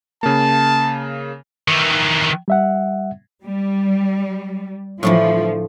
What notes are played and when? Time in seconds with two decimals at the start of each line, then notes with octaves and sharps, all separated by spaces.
0.23 C#3 A#3 A5
1.68 D#3 E3
2.48 G3 E5 F#5
3.43 G3
5.03 A2 D3 E3 F3